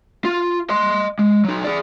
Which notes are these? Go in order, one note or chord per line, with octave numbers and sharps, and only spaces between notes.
F4
D#5 C6
G#3
F#3 D#4
G#4 D5